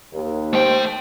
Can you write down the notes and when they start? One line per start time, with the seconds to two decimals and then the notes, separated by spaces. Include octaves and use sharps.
0.13 D#2
0.53 A3 C5 G5